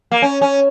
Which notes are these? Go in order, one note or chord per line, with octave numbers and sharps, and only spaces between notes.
A#3
C#4
C#4